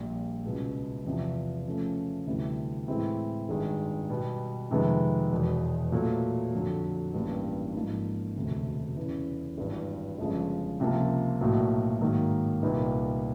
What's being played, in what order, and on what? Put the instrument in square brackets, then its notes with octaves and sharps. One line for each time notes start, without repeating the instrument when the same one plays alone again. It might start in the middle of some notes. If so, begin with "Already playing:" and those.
Already playing: [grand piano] A#1 A#2 G3
C#2 B2 G#3
E2 C3 F3
C#3 F3 A3 C#4
D2 C3 E3 G3
A2 E3 G#3 C4 E4
G#1 G2 D#3 G#3
B2 G3 B3
F2 C3 D#3 G#3 B3
E1 E2 B2
A#2 F#3 A3
F2 D3 F#3
A1 G2 E3 G3 A#3
G#2 F3 A#3 D#4
E1 D2 C3
E2 C#3 E3
G#1 G2 E3
G1 F#2 C#3 F3 G#3
C#2 C3 F3 A#3
B1 A2 F#3 A#3
G#2 D#3 F#3 A#3
C2 A#2 G3 B3 D#4